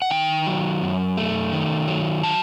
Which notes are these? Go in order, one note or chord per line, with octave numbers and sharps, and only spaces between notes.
F#5
D#3 G5
F#3
F#2
A3
D#3
F#3
A5